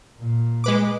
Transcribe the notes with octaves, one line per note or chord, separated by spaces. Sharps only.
A#2
G#3 B4 D6